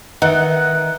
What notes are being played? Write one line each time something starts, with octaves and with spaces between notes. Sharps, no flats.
D#3 D#4 B4 E5 F#5